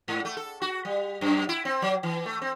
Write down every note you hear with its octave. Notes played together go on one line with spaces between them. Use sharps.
G#2
A3
A4
F#4
G3
F#2
E4
C4
F#3
E3
A3
C4